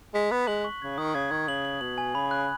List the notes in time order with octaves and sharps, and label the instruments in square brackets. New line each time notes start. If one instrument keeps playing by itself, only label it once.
[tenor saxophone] G#3 [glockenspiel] B6
[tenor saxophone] B3 [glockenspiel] F#6
[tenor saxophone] G#3 [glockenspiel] F#7
[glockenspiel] C#6
[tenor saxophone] C#3 [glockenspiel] G#6
[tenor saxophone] D#3 [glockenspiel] D#6
[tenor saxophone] C#3 [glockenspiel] G#6
[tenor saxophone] D#3 [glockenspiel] G#6
[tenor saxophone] C#3 [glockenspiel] F#7
[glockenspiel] F#7
[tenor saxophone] B2 [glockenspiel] F#7
[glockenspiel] G#5
[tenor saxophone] C#3 [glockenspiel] B5
[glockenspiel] F#6